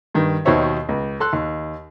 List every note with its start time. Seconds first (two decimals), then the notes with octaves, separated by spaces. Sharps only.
0.14 G2 D#3
0.45 D#2 B2 D#3 C5 C#5 E5
0.89 C#2
1.20 A4 C6 F#6
1.33 D#2